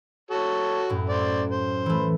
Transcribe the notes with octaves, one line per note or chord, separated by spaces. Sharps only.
F#4 A4 C#5
F#2 A2
C5 D5
C5
E3 A3